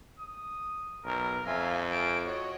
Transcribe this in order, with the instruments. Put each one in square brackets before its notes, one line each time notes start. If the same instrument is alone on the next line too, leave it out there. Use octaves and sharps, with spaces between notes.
[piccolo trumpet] D#6
[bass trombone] B1 [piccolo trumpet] A#4
[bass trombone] F2 [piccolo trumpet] F4 [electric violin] E5 G#5
[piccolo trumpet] G#5 [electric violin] D7
[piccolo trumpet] F#4 [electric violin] C#5 D#5